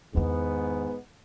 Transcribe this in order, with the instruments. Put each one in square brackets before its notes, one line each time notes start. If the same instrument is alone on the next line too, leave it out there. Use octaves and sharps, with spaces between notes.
[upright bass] E2 D#3 [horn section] G#2 B3